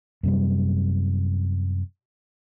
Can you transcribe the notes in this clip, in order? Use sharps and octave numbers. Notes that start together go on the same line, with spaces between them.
F#2 C3 G3